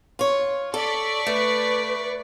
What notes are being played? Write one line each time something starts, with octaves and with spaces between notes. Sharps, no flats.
F4 C#5
A4 D5 C#6 B6
A3 B4